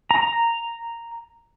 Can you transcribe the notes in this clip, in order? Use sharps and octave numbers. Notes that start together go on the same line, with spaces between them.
A#5